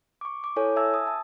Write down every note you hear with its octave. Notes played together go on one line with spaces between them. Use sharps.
C#6 D6
D6
E4 A4 C#5 G#5
E5 G#5 A5 E6 G#6
D#6
A5